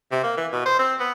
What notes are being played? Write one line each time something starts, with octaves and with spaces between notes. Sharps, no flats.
C3
A#3
E3
B2
C5
C4
B3